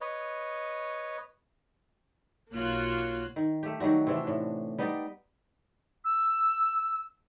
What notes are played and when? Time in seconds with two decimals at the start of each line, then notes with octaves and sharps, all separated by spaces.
0.01 B4 C#5 D#5
2.53 B1 A#3 F4 F#4 C#5 F#6
3.36 D#3
3.63 A3 G4
3.80 D#3 F#3 G3 F#4
4.07 C3 E3 D4
4.27 A2
4.78 G3 B3 D#4 D5
6.04 E6